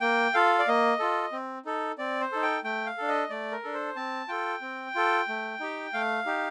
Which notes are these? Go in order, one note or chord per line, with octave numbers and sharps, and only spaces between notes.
A#3 G5
F4 A4 F5
D5
A#3 D#5
F4 A4
C4
D#4 A4
C4 D5
C5
D#4 A4
G5
A3 G5
F5
D4 A4
D#5
A3 D5
A#4
D4 A4
C5
C4 A5
F4 A4 G5
C4
F4 A4
A3
D#4 G4
A3 F5
D#4 G4